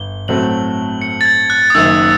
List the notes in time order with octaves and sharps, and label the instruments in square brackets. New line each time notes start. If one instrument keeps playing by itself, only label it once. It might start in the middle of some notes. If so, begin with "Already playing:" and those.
Already playing: [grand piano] G1 [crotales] G7
[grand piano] A2 F#3 A3 C4 [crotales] F#7
[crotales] C#7
A6
G#6
F#6
D#6
[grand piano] F#1 F#2 D#3 [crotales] E6